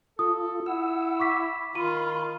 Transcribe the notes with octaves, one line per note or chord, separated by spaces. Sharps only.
F4 A4 D#6
E4 F#5 E6
C#6 D6 B6
D#3 F4 B5 C6 D#7